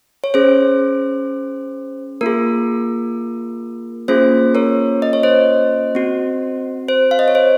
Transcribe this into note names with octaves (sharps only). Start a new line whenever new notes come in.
C#5
C#4 G#4 C5
A#3 F4 G#4 A#4
A#3 C#4 F4 G#4 C5
A#4 C#5
D#5
C#5
C5 D#5
C4 F#4
C5
F5
D#5
C#5
C5